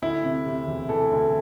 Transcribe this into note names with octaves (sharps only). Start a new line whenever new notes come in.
D2 E4
C3
C3
E1
E3 A4
D2